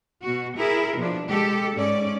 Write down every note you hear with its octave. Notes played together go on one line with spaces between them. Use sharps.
B2 F#4
E4 G#4 A#4
B2 F3 D4
G#3 G4 A4
G#2 C#4 D5